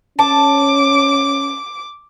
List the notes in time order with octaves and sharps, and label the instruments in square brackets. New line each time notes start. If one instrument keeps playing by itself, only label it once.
[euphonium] C#4 [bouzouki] A5 [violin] D6